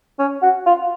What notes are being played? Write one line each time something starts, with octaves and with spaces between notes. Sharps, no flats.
C#4
F#4
F4